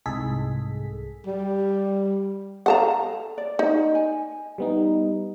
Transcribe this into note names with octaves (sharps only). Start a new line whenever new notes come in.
C2 G#2 G#3 G#4 A4 B6
G3
G#4 A4 F5 F#5 A5 A#5
D5
D#4
G#5
G3 B3 D#4